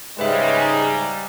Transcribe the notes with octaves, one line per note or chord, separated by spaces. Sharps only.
G#2 C#3 G3 G#3 B4 E5
G#5 A#5